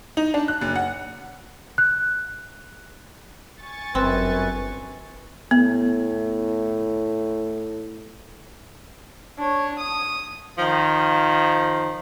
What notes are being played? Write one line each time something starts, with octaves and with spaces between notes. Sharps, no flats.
D#4
D4
F#6
F#1
F#5
F#6
G#5 C#6 A6
G1 F#2 C4 B4
A2 B3
D4 C#5
D#6
D#3 F3